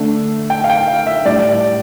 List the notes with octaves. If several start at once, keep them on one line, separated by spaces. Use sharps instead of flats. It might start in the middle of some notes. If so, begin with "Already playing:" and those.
Already playing: D3 A3 D4
G5
F5
G5
F5
E5
A2 G3 D4 D5
D5